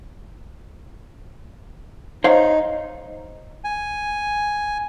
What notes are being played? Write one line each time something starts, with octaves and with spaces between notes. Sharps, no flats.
D#4 C5 C#5 F5
G#5